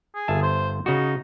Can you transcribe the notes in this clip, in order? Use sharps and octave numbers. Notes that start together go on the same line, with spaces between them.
G#4
G1 E5 A5
C5
C#3 D#4 F#4